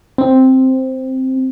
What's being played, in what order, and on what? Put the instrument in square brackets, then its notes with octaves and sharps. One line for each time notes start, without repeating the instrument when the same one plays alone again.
[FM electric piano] C4